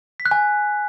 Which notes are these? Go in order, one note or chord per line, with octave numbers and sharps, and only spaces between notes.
B6
F#6
G#5